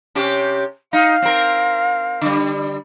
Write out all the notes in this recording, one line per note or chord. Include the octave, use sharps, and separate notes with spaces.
C3 C#4 G4
D#4 F5
C4 A#4
D3 G3